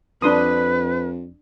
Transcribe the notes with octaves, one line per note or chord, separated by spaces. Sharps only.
F2 D4 B4 C6 D#6